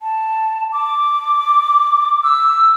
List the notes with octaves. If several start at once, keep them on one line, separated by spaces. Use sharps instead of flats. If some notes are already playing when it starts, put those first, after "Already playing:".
A5
D6
E6